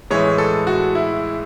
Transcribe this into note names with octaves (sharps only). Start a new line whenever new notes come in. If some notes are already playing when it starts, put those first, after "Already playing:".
A2 E3 G#3 C#5
A4
F#4
E4